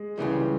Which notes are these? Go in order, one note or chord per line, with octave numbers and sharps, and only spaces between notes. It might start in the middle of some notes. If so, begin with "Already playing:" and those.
Already playing: G#3
C#2 C#3 E3 G3